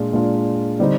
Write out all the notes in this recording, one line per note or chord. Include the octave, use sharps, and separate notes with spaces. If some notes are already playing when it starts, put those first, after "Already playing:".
Already playing: A#2 G#3 D4 F4
A#2 G#3 D4 F4
D3 G3 C4 D#4